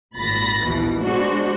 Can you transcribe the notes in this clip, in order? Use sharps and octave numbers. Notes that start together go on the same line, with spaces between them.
G#1 A#2 B5 A6 A#6
A#1 D#2 B2 E3
G#3 B3 D4 F#4 C5